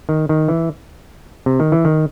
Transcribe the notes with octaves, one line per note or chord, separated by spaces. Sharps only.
D#3
D#3
E3
C3
D#3
E3
D#3